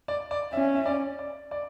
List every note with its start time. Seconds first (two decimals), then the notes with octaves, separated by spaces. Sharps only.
0.08 D5
0.31 D5
0.53 C#4 E5
0.75 E5
0.86 D5
1.19 D5
1.51 D5